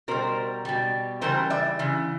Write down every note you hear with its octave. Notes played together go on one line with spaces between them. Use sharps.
B2 G3 A#4 C5
B2 G3
C#3 E3 G3 A#4 C5
D5 E5
C#3 E3